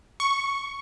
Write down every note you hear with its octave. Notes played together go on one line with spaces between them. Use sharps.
C#6